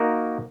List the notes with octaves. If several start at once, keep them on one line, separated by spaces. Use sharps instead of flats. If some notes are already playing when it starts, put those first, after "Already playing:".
Already playing: A#3 D#4 F#4 A#4